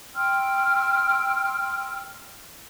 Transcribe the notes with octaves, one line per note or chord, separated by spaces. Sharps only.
G5 C6 E6 F6